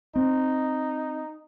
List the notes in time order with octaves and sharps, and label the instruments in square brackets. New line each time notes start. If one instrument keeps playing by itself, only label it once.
[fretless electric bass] C4 [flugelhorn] D#4